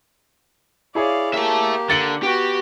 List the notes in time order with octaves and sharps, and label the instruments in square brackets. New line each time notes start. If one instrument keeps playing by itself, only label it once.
[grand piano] E4 G#4 C#5 [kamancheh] D5 F5
[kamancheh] A#3 G4 [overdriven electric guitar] E5 A5
[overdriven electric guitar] D3 [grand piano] A6 C#7 F#7
[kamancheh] B3 F#4 [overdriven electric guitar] G4